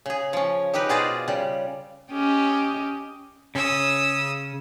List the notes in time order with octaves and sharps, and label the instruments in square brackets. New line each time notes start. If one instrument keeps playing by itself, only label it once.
[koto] C#3 G#4
F3 C#4
D#4 G4 A#4 B4
B2 F4 G#4 C5 D5 D#5
C#3 G3
[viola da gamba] C#4 G4 D#5
[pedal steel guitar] C#3 C#4 [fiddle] D#6 E6